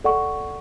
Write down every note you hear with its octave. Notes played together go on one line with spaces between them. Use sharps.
A4 D5 F#5 C#6